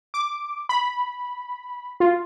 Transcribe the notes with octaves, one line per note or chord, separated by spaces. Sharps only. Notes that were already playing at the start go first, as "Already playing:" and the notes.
D6
B5
F4